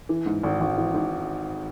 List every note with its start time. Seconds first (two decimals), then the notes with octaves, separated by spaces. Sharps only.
0.09 E3
0.26 G#2
0.44 G#1
0.61 G#1
0.77 E3
0.94 G#2